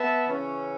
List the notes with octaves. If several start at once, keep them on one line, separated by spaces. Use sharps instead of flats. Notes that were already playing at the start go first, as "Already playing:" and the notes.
Already playing: B3 E5 A5
C#3 E3 C#4